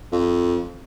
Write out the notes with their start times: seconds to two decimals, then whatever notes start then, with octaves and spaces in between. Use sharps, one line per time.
0.12 F2